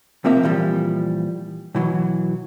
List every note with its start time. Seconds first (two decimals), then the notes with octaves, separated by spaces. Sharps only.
0.24 B1 C3 F3 A#3 C4 E5
0.43 A#2 E3 F3 G3
1.75 B2 E3 F#3